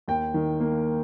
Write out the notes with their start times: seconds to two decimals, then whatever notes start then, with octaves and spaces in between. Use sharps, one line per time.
0.08 D#2 G5
0.34 D#3
0.60 A#3